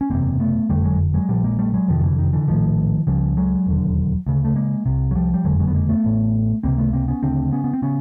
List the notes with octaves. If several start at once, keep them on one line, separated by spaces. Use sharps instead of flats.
C#4
F#1 E2 C3 A#3 C4
A3 B3
F#1 F2 D3 G3 A3
F#3 G#3
F#3 G#3
A#1 A#2 F3 G3
G#3 A#3
G3 A3
F#3 G#3
F#1 F2 C3 D#3 F3
F3
D3 E3
D#3
D3 E3
A#1 A2 D#3 F3
C#2 C#3 F3 G3
F#3 G#3
E1 D#2 D3
D2 C#3
A3
G#3 A#3
C2 C3
F#3
F3 G3
G3
F#1 F2 D3 F#3 G#3
F#3 G#3
B3
G#3 A#3
A3 B3
A1 A2
C#2 C3 A#3 C4
A3 B3
A#3 C4
B3 C#4
D2 C#3 C4 D4
B3 C#4
B3
C4
C#3 B3 C#4